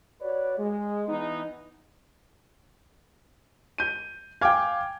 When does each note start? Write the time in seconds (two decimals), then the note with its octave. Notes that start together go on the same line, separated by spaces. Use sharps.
0.21 F#4 B4 C#5 D5
0.57 G#3
1.07 E3 B3 D#4
3.78 G6 D#7
4.41 F5 G5 G#5 D6 G#6